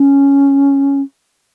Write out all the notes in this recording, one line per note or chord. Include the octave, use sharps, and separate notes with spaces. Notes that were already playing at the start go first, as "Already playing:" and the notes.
Already playing: C#4